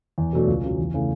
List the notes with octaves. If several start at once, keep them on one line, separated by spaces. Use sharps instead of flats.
E2
B2 F#3 A3 D4
C#2
C#3 F#3
E2
C#3 E3 A3